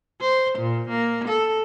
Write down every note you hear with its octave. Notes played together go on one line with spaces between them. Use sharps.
C5
A#2
A#3
A4